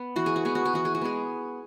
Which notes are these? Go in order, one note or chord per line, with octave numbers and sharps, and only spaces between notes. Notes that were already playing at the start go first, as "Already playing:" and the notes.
Already playing: B3
E3 F#4
G#4
F#4
G#3 B3 G#4
F#4
G#4
E3 F#4
G#4
F#4
G#3 B3 G#4